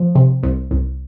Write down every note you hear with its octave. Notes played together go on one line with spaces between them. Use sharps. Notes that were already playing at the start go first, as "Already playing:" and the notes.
Already playing: F3
C3
C2
C2